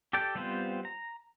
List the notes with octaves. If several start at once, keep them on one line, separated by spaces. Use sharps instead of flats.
G4 A4 D5 G5
G3 B3 C4 F4 C5
A#5